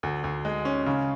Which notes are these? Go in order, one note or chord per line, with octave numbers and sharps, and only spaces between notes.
D2
D2
G#3
C#4
C#3